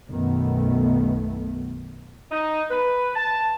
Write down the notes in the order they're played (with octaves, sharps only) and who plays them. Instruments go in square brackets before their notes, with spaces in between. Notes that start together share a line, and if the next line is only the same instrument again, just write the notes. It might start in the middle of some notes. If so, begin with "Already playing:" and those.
[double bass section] B1 F#2 D#3 A3 B3
[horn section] D#4
B4
A5